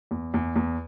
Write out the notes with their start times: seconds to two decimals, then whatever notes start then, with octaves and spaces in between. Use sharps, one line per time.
0.11 E2
0.34 E2
0.56 E2